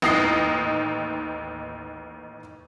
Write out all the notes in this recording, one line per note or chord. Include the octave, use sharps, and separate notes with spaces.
A1 D#2 D#4 D#6 A#6 C7